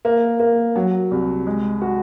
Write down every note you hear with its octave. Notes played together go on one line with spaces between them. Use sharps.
A#3
A#3
F#3
C2
G#3
F#4